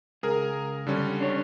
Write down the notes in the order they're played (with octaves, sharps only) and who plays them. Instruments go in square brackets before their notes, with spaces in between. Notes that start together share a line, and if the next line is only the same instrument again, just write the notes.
[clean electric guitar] C#2 [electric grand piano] G#4 A#4
[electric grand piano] D3 G3 C#4
[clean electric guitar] D4 C#5